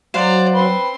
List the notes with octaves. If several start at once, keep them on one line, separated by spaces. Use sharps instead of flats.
F#3 C5 D5 F5 F#5 A#5
C4 B4 C6